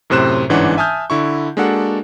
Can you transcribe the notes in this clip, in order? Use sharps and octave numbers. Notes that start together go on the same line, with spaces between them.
F#2 A2 C3 C5 F#6 E7
G1 G#2 E3 C#4 D4 F#5
E5 G#5 A5 D#6 F6 G6
D3 E4 C#6
G#3 A#3 D4 F#4 A4 F#5